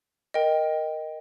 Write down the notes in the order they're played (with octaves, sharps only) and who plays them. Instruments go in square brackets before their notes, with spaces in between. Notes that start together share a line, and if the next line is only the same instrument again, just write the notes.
[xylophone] A#4 D#5 G5